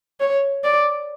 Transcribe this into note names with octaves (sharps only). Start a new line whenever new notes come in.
C#5
D5